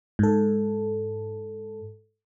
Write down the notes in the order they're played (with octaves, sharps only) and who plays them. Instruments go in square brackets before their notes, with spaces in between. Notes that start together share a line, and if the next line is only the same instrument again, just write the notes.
[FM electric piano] G#2 A4